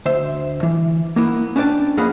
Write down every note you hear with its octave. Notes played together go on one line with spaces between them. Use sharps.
D2 C5 E5
E3
A#3 B3 E4
C#4 D4 B4 D5 G5 A5
F2 A#3 C#4 G#4 F#5 B5